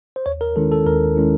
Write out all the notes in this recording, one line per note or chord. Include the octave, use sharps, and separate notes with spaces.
C5
D#2 C#5
A#4
D#3 G#3 C#4 E4 A4
A4
D#2 A#4
D#3 G#3 C#4 E4